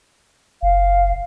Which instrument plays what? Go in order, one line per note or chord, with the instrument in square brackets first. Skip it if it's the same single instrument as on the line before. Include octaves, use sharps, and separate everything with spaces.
[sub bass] F#1 [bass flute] F5